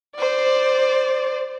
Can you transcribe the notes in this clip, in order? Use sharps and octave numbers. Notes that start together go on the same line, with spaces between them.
C5 D5